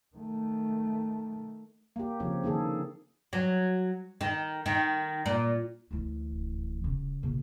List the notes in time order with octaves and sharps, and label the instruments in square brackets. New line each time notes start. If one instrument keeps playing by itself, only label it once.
[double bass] D#3 A3
[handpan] A#3 G4
C#3 F3 C4 G4 C#5
D3 D#3 A#3 G#4 A4
[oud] F#3
D#3
D#3
A#2
[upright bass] D2 E3
[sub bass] D#1
[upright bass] C#3
[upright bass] A#2 [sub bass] C#3